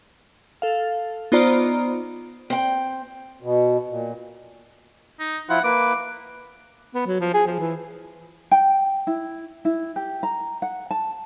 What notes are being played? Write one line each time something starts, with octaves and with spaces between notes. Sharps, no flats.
A4 F5
B3 D#4 F4 C5 D5 A#5
C4 G5
B2
A#2
D#4
F3 E4 F4 F#5
A#3 B4 D6
B3
F#3
F3
G#4
F3
E3
G5
E4
E4
G4
A#5
F#5
A5